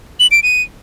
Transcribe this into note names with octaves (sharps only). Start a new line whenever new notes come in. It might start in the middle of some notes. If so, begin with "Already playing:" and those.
F#7
D7
D#7